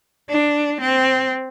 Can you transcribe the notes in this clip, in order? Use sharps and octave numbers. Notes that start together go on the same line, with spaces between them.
D4
C4